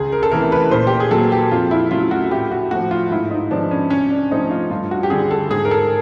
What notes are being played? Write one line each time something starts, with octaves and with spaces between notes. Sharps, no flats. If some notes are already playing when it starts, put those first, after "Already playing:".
Already playing: C#2 G#4
A#4
A4
C3 E3 A3 A#4
B4
A#2 C5
G4
G#4
F#3 A#3 A4
G4
F2 F4
E4
C#3 F#3 A3 F4
F#4
A2 G4
F#4
F3 A3 F#4
F4
G#2 E4
D#4
F3 G#3 B3 D4
C#4
C2 C#4
D4
C3 F3 A3 C4 D#4
F4
G2 F4
F#4
G4
D3 G3 G#4
A4
G#2 G#4
A#4
A4